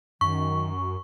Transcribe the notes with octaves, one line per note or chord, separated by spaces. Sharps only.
F#2 D#3 C#6